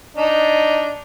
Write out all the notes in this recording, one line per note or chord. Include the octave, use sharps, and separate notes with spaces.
D4 D#4